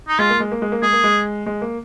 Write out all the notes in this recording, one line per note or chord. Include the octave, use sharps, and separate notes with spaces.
D#4
G#3 F4
A#3
G#3
A#3
G#3
A#3
G#3 G#4
A#3
G#3
G#3
A#3